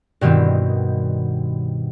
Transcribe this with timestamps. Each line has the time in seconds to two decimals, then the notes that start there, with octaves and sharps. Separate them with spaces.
0.21 G2 B2 D#3 B3 C4